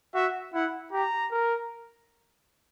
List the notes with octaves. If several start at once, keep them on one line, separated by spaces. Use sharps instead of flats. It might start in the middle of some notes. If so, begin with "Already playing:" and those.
F#4 E5
E4 F#5
G4 A#5
A#4